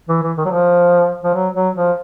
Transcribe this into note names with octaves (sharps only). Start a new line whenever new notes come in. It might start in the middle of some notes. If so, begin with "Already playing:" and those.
E3
E3
D#3
F#3
F3
F3
F#3
F#3
F3